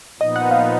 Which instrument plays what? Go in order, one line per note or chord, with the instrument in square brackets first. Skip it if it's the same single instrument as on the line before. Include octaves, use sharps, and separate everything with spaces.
[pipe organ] A#2 F3 B3 D#4 [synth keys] D#5
[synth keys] F#5
F5